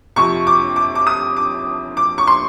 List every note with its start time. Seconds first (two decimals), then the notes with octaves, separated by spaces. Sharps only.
0.16 F2 C3 F3 C#6
0.47 D6
0.76 D6
0.95 D6
1.07 D#6
1.37 D6
1.97 D6
2.18 C#6
2.27 C6